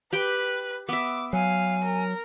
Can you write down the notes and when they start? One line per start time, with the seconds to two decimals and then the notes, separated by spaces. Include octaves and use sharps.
0.13 G4 B4 G5
0.89 B3 E5 D6
1.33 F#3 F5 G#5
1.84 A#4